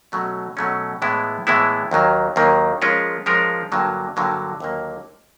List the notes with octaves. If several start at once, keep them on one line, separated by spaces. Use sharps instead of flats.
B2 F#3 A3 C#4
B2 F#3 A3 C#4
A2 E3 G#3 B3 E4
A2 E3 G#3 B3 E4
D#2 D#3 F#3 A#3
D#2 D#3 F#3 A#3
F3 G#3 C#4 F4 A#4
F3 G#3 C#4 F4 A#4
G2 D3 F#3 A#3
G2 D3 F#3 A#3
D#2 D3 F#3 A#3